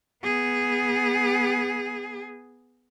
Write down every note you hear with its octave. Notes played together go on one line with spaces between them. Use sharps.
B3 G#4